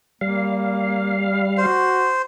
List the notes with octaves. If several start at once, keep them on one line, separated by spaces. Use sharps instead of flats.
G3 A#3 F5
F#4 C5